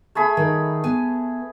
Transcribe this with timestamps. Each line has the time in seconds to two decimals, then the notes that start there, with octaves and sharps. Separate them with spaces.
0.15 A3 G#4 B5
0.37 D#3
0.84 B3 G#5